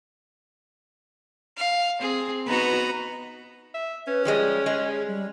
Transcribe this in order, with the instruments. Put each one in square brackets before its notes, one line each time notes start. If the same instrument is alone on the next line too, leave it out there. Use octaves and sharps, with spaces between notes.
[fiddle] F5
[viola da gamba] C4 [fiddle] G#4
[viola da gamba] B3 D#4 F#4 [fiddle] B4 A#5
[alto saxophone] E5
[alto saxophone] C#4 [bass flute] B4
[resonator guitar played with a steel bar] F3 G3 G#3 [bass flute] G#4
[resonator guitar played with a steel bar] G#3
[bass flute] G3